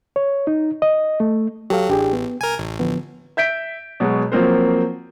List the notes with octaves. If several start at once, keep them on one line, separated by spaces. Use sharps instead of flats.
C#5
D#4
D#5
A3
F#3 G4 A4 F5
A1 D4 G4 G#4
B3
C2 A#4 G#5
A1
D3 F3 B3
E5 G6 B6 D7
B2 F#3 G#3
F3 F#3 A#3 C4 A#4 C5